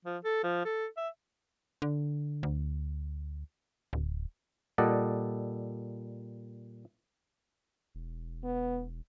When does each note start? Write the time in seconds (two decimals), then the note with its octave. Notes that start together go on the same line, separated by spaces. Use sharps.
0.05 F3
0.24 A4
0.44 F3
0.65 A4
0.97 E5
1.82 D3
2.43 D2
3.93 D1
4.78 A#2 G3 A4 D5 D#5 F#5
7.95 E1
8.44 B3